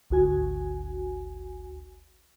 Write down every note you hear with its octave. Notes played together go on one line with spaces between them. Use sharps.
G#1 D2 F#4 G#5